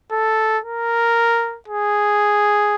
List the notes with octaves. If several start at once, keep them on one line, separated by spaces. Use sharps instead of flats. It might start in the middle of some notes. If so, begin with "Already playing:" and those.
A4
A#4
G#4